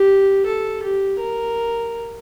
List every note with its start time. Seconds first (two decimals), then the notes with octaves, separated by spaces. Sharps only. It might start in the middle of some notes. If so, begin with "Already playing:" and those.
Already playing: G4
0.45 A4
0.83 G4
1.20 A#4